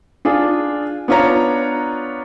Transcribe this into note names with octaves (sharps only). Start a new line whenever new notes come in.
D4 F4 G#4
B3 D4 F4 C#5 A#5